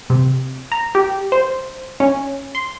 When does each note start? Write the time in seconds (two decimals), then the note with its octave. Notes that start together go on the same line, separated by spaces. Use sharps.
0.10 C3
0.72 A#5
0.95 G4
1.32 C5
2.00 C#4
2.55 C6